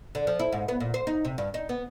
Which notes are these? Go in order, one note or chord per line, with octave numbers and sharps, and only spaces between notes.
D3
F3
E4
G#2
B3
A#2
C5
D#4
C3
G2
D#4
B3